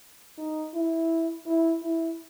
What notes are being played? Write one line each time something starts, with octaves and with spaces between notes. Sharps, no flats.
D#4
E4
E4
E4